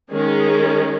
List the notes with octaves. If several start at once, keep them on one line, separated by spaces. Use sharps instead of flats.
D#3 G#3 C#4 G#4